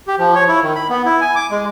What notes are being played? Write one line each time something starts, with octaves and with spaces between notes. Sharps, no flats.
G4
F3
C#5
E4
D#3
B5
B3
E4
G#5
D6
G#3